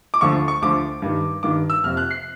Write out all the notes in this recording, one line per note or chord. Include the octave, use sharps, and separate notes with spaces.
D6
D2 D3 F3 C#6
C#6
D2 D3 F3 D6
G2 D#3
G2 D#3 D6
E6
F2 C3 F3 F6
F#6
C7